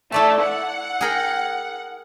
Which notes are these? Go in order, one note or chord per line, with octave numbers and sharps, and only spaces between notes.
A3 E4 D5 A5
F#5
G#4 A#4 G5